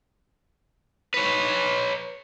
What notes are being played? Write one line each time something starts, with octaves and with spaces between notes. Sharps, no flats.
B4 C#5